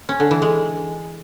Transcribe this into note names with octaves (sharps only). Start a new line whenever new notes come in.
C#4
D3
E3
G#3